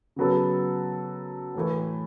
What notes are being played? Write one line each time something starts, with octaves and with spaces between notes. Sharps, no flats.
C#3 F#3 B3 A4
A2 E3 A3